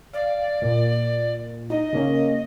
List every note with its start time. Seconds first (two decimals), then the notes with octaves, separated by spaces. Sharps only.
0.13 D5 F5
0.62 A#2
1.70 D#4 D#5
1.93 C#3 A#3 C#4